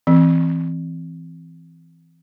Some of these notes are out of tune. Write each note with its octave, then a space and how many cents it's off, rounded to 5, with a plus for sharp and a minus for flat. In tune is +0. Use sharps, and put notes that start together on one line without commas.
E3 +0 C4 +0